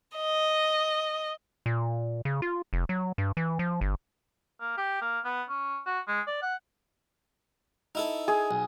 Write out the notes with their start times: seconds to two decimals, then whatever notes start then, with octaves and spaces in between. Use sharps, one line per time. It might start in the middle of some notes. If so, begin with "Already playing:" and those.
0.18 D#5
1.66 A#2
2.25 C#3
2.42 F4
2.73 F1
2.89 F#3
3.18 G2
3.37 E3
3.59 F3
3.81 G1
4.60 A#3
4.78 G4
5.01 A#3
5.25 B3
5.49 C#4
5.86 F#4
6.08 G#3
6.27 D5
6.42 F#5
7.95 D#4 E4 A4
8.28 G#4
8.51 B1